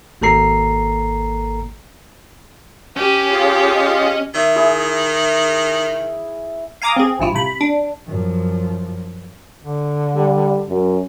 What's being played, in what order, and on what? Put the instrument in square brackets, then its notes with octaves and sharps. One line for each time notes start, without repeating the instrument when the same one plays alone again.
[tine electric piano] G#1 A#3 A4 A#5 C7
[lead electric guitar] C#4 [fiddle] G4
[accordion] F4 G#4 F5 [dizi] C#5
[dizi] D#5
[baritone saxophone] D#3 [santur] E5
[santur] E4 G#4
[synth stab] F5 G#5 A#5 D6 D#6
C4 G#4
A1 G2 E4 F4
C3 B5
D4
[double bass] F#2 F3
[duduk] D3
[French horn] G3
F#2